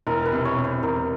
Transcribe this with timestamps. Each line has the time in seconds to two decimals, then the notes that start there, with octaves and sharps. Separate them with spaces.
0.07 E1 A#4
0.26 B4
0.32 C3
0.45 C#5
0.58 C3
0.64 C5
0.83 E1 A#4